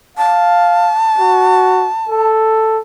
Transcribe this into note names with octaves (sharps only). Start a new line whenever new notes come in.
F5 A5
F#4
A4